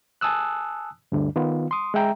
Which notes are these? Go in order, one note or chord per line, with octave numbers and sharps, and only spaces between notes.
G#5 A5 D#6 E6 F#6
D2 G2 D3
D#3 B3 F4
C6 D#6
G#3 E5 G5 A#5